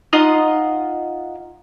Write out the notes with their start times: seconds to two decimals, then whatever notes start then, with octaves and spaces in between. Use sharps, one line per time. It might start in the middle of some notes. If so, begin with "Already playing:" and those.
0.13 D#4 F4 D#5 F#5